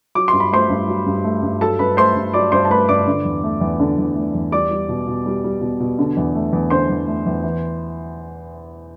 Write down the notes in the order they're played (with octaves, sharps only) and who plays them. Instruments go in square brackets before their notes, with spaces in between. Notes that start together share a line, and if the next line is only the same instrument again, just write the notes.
[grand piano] F#3 D6
C6
G2
B5
A3 C5 C6
G2
F#3
G2
A3
G2
F#3 A4 A5
G2 B4 B5
A3 C5 C6
G2
F#3 D5 D6
G2 C5 C6
A5
A3 B4 B5
G2 D5 D6
D3
E2
A3
E2
D3
E2
A3
E2
G3 D5 D6
G3
B2
B2
G3
G3
B2
B2
D3
E2
A3
E2
D3 C5 C6
E2
A3
E2
E3